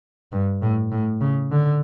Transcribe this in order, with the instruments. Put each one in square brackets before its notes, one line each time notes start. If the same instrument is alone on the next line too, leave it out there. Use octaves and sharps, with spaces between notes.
[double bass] G2
A2
A2
C#3
D3